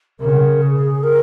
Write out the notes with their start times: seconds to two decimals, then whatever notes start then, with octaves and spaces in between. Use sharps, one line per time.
0.20 C#3 A#4
0.62 G#4
1.03 A#4